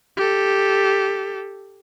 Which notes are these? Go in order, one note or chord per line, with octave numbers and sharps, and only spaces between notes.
G4 A4